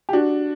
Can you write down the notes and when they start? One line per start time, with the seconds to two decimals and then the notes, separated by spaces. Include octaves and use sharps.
0.09 G4
0.13 D4 F#4